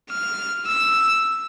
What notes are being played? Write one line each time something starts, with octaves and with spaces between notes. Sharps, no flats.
F6
E6